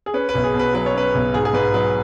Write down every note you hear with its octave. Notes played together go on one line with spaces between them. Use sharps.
G#4
C#4 B4
B4
B1
G#4
B2
B4
F#3 B4
C#5
C#4 B4
B1
G#2 G#4
G#4
G#2 B4
F#3 B4